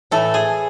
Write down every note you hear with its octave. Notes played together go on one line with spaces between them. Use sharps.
A2 E3 A3 A4
G#4